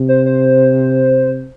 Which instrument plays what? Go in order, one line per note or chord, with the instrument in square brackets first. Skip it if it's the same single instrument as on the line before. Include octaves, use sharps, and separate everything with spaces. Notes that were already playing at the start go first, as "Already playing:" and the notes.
Already playing: [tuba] C3
[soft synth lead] C5
C5